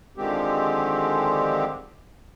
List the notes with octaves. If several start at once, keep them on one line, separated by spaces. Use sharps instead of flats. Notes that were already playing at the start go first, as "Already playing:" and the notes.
D3 D#3 F3 G#3 C4 G4